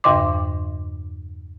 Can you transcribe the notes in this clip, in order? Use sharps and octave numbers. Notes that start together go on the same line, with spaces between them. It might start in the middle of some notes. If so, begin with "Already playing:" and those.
E2 G2 C#3 D#5 C6 D6